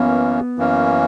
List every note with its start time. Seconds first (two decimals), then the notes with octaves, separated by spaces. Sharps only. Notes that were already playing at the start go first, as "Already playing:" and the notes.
Already playing: F#2 E3 A#3 B3 C#4
0.58 F#2 E3 A#3 C#4